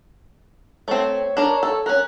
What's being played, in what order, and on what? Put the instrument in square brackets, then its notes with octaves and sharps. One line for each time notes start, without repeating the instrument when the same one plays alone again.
[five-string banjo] A3 C4 [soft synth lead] C#5
[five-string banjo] D4 A#4
A4
[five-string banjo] C#4 A#4 [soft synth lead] F#6